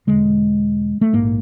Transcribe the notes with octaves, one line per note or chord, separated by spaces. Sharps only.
E1 D#2 D3 G#3
A3
A#1 G#2 A#3